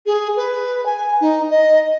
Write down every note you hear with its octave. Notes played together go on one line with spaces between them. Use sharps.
G#4
B4
G#5
D#4
D#5